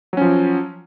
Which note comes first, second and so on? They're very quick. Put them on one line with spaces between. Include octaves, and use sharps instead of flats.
F#3 C#4 F3